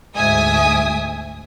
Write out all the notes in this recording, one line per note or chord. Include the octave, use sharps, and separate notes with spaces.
D2 G#2 E5 G#5 D#6